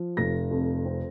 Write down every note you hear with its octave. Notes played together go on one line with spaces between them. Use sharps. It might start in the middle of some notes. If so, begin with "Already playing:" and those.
Already playing: F3
F1 A#6
F2
C4